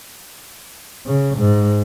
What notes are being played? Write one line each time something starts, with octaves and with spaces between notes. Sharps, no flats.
C#3
G#2